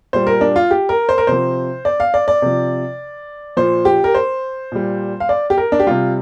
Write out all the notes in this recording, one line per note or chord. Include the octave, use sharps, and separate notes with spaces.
A#2 G3 C5
A#4
D4
F4
G4
A#4
C5
A#4
C3 F3 C5
D5
F5
D5
D5
C3 F3
A#2 F3 C5
G4
A#4
C5
A#2 G3
F5
D5
G4
A#4
D4
G4
C3 G3 F4